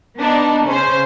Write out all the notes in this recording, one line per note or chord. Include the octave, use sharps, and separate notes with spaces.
B3 D4 D#4
C#3 C#4 C5